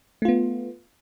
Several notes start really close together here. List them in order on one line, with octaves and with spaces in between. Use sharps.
A3 F4 B3